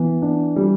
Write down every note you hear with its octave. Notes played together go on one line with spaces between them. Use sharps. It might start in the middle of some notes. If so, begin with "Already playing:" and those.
Already playing: E3 B3
D4
G3